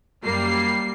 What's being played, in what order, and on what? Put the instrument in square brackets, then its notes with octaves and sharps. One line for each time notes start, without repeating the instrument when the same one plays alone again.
[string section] F#2 G3 A#3 C7